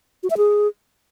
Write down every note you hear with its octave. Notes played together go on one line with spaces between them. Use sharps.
F#4
E5
G#4